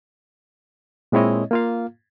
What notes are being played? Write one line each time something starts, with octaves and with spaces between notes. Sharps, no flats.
A#2 G#3 C4 E4 C#5 D#5
A#3 F4 F5